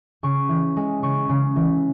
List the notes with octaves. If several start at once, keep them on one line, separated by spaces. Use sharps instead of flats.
C#3 C#6
E3
G#3
C#3 C#6
C#3
E3